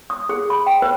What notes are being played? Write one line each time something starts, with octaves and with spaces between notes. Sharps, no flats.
D#6
G#4
B5
G5
B4